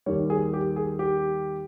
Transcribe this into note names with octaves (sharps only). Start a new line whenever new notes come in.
D#2 D#3 G3 C#5
G#4
G4
G#4
G4